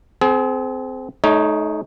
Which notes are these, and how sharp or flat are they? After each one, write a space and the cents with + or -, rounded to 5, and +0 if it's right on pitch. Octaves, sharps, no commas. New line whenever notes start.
C4 -20 G#4 +35
A3 -35 D#4 +5 C#5 +0